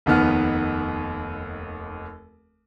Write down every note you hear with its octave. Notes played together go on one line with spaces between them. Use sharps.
F1 D#2 D#3 B3 F6